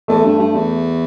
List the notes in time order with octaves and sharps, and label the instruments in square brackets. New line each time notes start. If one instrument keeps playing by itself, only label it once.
[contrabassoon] E2 [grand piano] A3
[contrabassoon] G2
G2
E2